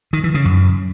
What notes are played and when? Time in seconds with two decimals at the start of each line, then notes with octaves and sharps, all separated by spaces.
0.13 D#3
0.24 E3
0.34 C#3
0.45 F#2